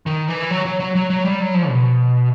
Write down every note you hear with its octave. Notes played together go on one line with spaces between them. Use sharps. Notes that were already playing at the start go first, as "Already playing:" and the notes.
D#3
E3
F#3
F#3
F#3
F#3
F#3
G3
F#3
F3
B2